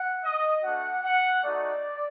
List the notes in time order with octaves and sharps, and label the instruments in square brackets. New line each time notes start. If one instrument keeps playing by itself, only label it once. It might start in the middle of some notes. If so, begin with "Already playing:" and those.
Already playing: [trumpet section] F#5
D#5
A3 D4 F#4 F#5
F#5
A3 D#4 F#4 D5